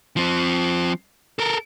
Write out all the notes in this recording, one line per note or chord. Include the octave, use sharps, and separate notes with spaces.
F3 C4
A4 A#4